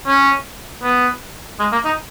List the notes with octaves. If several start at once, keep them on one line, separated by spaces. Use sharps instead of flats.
C#4
B3
G#3
A#3
D#4